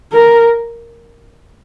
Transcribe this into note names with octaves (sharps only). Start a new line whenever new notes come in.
A#4